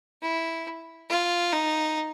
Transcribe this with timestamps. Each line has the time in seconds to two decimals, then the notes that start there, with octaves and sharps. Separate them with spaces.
0.22 E4
1.10 F4
1.53 D#4